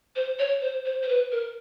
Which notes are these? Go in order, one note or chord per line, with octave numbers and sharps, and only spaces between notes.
C5
C#5
C5
C5
C5
B4
A#4